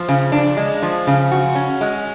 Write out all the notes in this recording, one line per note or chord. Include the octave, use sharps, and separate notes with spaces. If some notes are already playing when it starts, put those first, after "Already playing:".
Already playing: F3
C#3
D4
G#3
F3
C#3
F#4
C#4
G#3